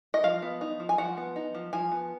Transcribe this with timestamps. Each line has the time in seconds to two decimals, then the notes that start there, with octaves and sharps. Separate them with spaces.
0.14 D#5
0.24 F3 F5
0.42 B3
0.61 D#4
0.80 F3
0.89 G#5
0.98 F3 F#5
1.17 B3
1.36 D#4
1.55 F3
1.73 F3 G#5
1.92 B3